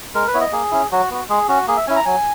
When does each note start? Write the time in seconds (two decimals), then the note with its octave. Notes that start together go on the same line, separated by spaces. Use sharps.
0.14 G#3 A#4
0.27 B4
0.34 B3 E4 C#5
0.41 D#5
0.52 A#3 G#4
0.71 C#4 E4
0.92 F#3 F#4
1.11 B3 F#4
1.29 G#3 G#4
1.48 C#4 F#4
1.67 A#3 G#4
1.77 E5
1.87 C#4 E4 G#5
1.96 A#5
2.05 F#3 G#5